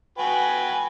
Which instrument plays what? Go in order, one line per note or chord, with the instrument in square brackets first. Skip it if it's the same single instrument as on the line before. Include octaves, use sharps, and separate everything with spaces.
[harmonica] F#4 B4 G5 [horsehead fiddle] G#5